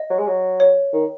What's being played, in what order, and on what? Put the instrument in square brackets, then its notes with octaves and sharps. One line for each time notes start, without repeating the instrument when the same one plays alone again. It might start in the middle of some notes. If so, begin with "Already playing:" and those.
Already playing: [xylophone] D#5
[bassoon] F#3
G#3
F#3
[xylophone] C#5
[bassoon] D#3